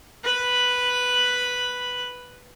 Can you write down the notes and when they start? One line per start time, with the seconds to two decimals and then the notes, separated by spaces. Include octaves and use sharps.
0.24 B4 B5